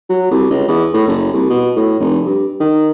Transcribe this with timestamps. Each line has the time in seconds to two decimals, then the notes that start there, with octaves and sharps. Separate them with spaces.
0.09 F#3
0.31 C2
0.50 C#2
0.68 E2
0.93 A2
1.07 F#1
1.33 C2
1.50 B2
1.76 A2
2.00 F1
2.25 G2
2.60 D#3